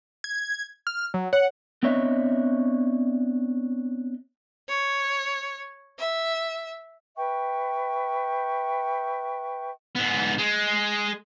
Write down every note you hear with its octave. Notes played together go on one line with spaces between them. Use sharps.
G#6
F6
F#3
C#5 F#5
B3 C4 D4 C#5 D#5 E5
C#5
E5
B4 E5 G5 C#6
G#2 B3
G#3